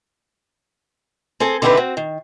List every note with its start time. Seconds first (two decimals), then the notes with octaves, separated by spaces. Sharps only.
1.40 C4 G#4 A4 A5
1.62 D3 D#3 C4 E4 G4 B4
1.77 C4 F#4
1.97 D#3